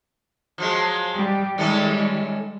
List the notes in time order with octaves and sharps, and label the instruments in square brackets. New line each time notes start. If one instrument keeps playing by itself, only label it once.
[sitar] F3 F#3 G#3
[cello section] G3 G4
[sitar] D#3 C#4 A4 [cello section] G3 G#3